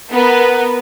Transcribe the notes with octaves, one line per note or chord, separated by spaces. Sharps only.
B3 A#4 B4